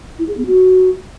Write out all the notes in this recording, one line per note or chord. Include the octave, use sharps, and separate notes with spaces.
E4
G#4
B3
F#4